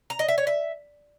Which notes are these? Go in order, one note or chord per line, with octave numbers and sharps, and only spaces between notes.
A#5
D#5
E5
C#5
E5